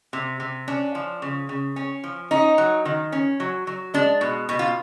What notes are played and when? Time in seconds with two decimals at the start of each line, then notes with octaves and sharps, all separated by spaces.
0.13 C3
0.40 C3
0.68 C#4 D4
0.95 F3
1.22 C#3
1.49 C#3
1.76 C#4
2.04 F3
2.31 C#4 D#4
2.58 F#3
2.85 D#3
3.12 C#4
3.40 F#3
3.67 F#3
3.94 G#3 D4
4.21 B2
4.49 B2
4.59 F4